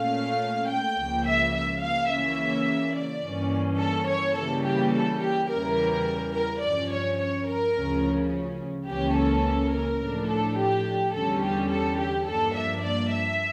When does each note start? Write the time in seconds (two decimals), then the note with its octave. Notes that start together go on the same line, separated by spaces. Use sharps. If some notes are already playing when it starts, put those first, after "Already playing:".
Already playing: A#2 A3 C#4 F5
0.69 G5
0.96 C#2 C#3 F3 A#3
1.25 E5
1.53 E5
1.81 F5
2.09 C#3 E3 A#3 C#4 E5
2.95 D5
3.23 G2 E3 A#3 C#4
3.80 A4
4.08 C#5
4.36 C#3 E3 G3 A#3 A4
4.65 G4
4.93 A4
5.21 G4
5.49 E2 C#3 E3 G3 A#4
6.34 A#4
6.62 G2 F3 C#4 D5
6.90 C#5
7.19 C#5
7.47 A#4
7.75 D2 C#3 F3 C#4
8.88 C#2 C#3 E3 A#3 C#4 G4
9.16 A4
9.73 A#4
10.01 A2 F3 A3 D4
10.29 A4
10.58 G4
11.14 E2 D3 G3 C#4 A4
11.42 G4
11.71 A4
11.99 G4
12.27 G2 F3 A#3 D4 A4
12.56 E5
12.84 D5
13.12 E5